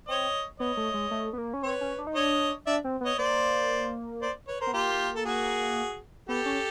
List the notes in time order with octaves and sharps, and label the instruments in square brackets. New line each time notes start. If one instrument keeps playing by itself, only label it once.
[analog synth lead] C4 [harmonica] C#5 D#5
[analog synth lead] B3 [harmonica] C#5 D#5
[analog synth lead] A3
G#3
A3
B3
A#3
C#4
[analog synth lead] C4 [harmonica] B4 C#5
[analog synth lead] C#4
D4
D#4
[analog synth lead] D4 [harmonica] C#5 D#5
[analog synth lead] D4 [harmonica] D5 E5
[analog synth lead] C4
[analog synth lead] B3 [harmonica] C#5 D#5
[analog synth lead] A#3 [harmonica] C5 D5
[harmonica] C5 D5
B4 C#5
A#4 C5
[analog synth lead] B3
[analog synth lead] A#3 [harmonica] F4 G4
[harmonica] A4
F#4 G#4
[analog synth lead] B3 [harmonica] G4 A4
[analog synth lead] C#4